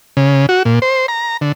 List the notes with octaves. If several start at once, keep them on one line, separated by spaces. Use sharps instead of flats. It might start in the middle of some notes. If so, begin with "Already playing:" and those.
C#3
F#4
A#2
C5
A#5
D3